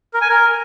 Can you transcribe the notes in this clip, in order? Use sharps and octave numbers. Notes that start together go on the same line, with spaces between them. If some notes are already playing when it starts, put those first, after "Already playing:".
A#4
G#5
A#4